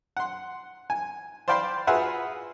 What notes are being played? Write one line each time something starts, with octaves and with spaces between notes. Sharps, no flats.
F#5 C6
G#5
C5 D5 F5 G5 B5 C6
F4 F#4 G#4 B4 E5 F#5